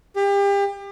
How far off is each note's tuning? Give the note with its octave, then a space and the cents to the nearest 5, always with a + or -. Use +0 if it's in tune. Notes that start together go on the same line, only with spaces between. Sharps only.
G4 +35